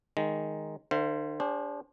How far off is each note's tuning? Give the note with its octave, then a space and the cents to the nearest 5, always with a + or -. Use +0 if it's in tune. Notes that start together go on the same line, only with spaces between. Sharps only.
D#3 +0 G#3 +0
D3 +45 C5 -5 F5 -45
D4 -25 G#4 -45 C5 +15